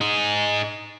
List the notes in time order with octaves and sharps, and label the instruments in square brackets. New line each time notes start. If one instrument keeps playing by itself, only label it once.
[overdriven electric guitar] D#4 G#4